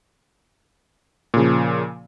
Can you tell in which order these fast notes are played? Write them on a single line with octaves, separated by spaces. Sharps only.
A#2 C#3 F3